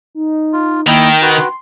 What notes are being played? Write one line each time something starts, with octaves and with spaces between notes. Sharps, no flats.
D#4
F4
D#3 A#3 D#4 E4 G5
F#4 B4 C6